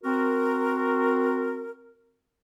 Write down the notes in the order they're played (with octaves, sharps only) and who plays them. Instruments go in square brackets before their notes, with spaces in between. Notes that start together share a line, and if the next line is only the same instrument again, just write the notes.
[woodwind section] C4 F#4 A#4